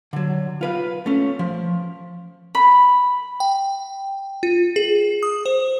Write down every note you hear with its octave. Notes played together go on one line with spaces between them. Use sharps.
D3 F#3
F4 B4 F5
A3 C#4
F3
B5
G5
F4
G#4
D#6
C5